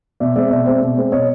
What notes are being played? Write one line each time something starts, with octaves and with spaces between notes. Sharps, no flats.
B2 D5 E5
G#3 C4 D5 E5
B2 D5 E5
G#3 C4
B2
G#3 C4
B2 C#5 D#5